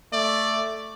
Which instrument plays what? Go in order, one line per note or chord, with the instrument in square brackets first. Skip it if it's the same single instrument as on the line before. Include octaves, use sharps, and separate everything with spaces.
[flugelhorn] A3 [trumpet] D5